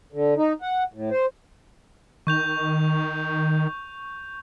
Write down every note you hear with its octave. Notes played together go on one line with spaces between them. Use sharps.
D3
D#4
F#5
A2
C5
D#3 C#6 G6 F7